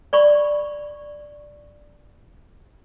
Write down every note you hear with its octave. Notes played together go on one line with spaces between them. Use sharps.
D5 B5 C#6